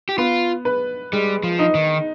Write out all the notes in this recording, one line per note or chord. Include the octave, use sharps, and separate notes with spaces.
G4
B3 F4
B4
G3 G#3
F3
D#4
D#3